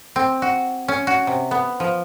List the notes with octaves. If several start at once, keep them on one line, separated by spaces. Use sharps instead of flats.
C4
F#4
C#4
F#4
C3
B3
F3